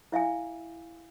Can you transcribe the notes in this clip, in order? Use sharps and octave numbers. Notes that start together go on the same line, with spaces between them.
E4 E5 F5 G#5